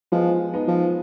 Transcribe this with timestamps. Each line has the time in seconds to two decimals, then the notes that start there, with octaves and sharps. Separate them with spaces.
0.12 F3 G#3 B3
0.53 B3 D#4
0.67 F3